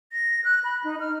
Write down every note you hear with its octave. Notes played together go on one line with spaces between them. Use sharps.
A#6
F#6
B5
D#4
F6